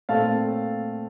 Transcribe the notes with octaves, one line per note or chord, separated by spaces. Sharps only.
A#2 A3 C4 F5 A5